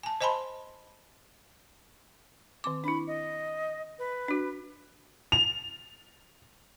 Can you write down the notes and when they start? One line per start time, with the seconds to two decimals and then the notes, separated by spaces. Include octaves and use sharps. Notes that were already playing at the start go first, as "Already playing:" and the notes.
0.03 G#5 A5
0.21 C5 D#5 G#5 A5 B5 C6
2.64 D#3 C4 D6
2.84 D4 E4 B5
3.07 D#5
3.99 B4
4.28 D4 F#4
5.32 F7